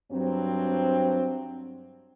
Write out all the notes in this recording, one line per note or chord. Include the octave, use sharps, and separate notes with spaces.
G2 F#3 C4